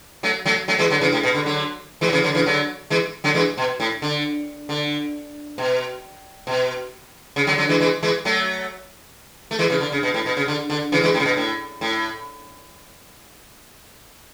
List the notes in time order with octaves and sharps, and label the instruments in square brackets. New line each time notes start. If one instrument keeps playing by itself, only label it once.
[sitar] F#3 A3
F#3 A3
F#3 A3
E3 G#3
D3 F#3
C#3 E3
A2
B2
D3
D3 F#3
E3 G#3
F#3
C#3 E3
D3 F#3
C#3 E3
D3 F#3
E3 G#3
D3 F#3
E3 G#3
B2
A2
D3
D3
B2
B2
C#3
D3 F#3
D3 F#3
E3 G#3
E3 G#3
E3 G#3
F#3 A3
A3
E3 G#3
C#3 E3
D3
C#3
B2
A2
B2
C#3
D3
D3
C#3 E3
E3 G#3
A2
C#3
B2
A2
A2